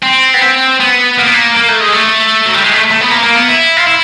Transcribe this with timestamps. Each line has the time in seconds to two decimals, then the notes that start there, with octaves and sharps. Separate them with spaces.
0.03 C4
0.34 B3
0.42 C4
0.80 B3
1.18 A#3
1.26 B3
1.34 A#3
1.57 A#3
1.68 A3
1.81 G#3
1.93 A3
2.46 F#3
2.54 G3
2.63 G#3
2.72 A3
2.91 A3
3.01 B3
3.11 A#3
3.23 A#3
3.36 B3
3.49 E4
3.77 F4
3.87 E4